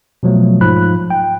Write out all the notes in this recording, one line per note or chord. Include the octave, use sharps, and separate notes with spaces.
B2 F3 F#3 A3
G#2 F3 B5 F#6
G5